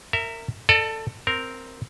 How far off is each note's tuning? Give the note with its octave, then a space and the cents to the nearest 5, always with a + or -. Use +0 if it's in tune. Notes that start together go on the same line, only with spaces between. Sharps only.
A#4 -25 E5 +0
A4 +15 D5 +40
C4 +0 A#4 +0